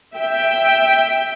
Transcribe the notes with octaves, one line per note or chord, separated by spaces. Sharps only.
E5 G5